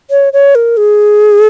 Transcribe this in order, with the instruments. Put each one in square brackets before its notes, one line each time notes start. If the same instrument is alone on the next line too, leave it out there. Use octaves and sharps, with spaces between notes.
[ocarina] C#5
C#5
A#4
G#4